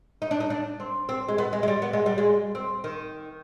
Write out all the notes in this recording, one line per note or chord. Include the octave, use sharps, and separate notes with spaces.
D#4
D4
D#4
D4
C4
C4
G#3
B3
G#3
G#3
G3
B3
G#3
G3
G#3
C4
D#3